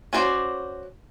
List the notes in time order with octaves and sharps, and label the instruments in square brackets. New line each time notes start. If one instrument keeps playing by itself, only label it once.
[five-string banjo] C#4 F#4 C5 D5